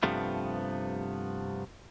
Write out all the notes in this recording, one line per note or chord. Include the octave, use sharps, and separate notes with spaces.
G2 C3 F3 A3 B3